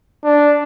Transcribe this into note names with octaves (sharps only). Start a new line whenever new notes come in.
D4